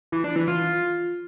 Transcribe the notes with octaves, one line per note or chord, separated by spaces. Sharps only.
E3
D4
E3
F4